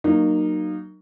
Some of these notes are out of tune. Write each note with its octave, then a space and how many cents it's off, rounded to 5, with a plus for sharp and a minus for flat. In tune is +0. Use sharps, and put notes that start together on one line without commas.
F#3 +15 A#3 +0 D#4 -25